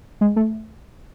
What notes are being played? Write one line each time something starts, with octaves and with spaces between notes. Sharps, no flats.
G#3
A3